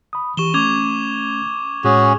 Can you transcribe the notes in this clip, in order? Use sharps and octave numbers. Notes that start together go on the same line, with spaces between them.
B5 D#6
E3 G4 C#6 E7 G7
A3 C#4 D6 G#6 F7
A2 G#3 C#4 F#4 G#4